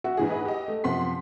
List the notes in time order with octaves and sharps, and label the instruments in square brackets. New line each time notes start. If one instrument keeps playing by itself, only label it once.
[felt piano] F#4 E5 F#5
[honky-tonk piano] G#2 E3 G#4
G#4 B4 D#5
G4 D#5
[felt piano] A3
[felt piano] F#2 C3 F3 [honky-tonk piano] F#5 C6 B6